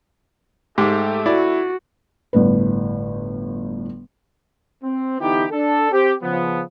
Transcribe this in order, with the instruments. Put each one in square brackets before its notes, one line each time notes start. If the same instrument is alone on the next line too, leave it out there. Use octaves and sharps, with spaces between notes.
[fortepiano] G#2 [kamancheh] A3 [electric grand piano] G4 D6
[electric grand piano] E4 [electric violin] F#4 [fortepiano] D5
[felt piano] G1 A2 B4
[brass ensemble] C4
D3 E3 B3 D#4 E4 G4
D4 A4
C4 G4
C#3 F3 B3